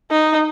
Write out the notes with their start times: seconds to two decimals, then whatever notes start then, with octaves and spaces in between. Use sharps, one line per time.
0.11 D#4